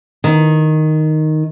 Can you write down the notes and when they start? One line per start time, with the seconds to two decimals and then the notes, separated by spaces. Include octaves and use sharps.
0.24 D#3